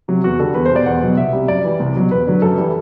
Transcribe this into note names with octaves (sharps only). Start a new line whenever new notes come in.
C3 F#3
E2 F#4
D3 G3 A4
E2 B4
C5
B2 G3 D5
E2 F#5
B2 F#3
C2 E5
C3 G3
F#2 D5
E3 G3
C2
B2 F#3
E2 B4
D3 F#3
F#2 A4
E3 G3